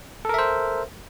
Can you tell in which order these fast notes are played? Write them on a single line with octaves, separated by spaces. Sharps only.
A4 A#4 E5 C5